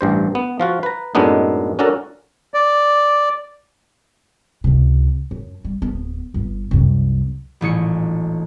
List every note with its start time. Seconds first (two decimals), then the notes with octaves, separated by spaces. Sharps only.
0.01 A1 G2 C5
0.35 B3
0.60 F3 F4 F#4
0.83 B4 A#5
1.15 F#2 A2 G#3 B3 D4 D#4
1.79 C#4 D4 F#4 A4 A#4
2.54 D5
4.64 C#2 C3
5.31 F#2
5.64 G3
5.82 D1 B3
6.34 G1 B3
6.71 C2 F#2
7.61 D#1 A1 G#4 C#7